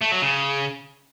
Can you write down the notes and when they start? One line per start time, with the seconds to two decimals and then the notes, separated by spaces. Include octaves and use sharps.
0.01 A3
0.12 F#3
0.22 C#3